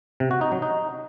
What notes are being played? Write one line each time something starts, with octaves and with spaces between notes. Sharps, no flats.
C3
F#4
D#4
F#3
D#4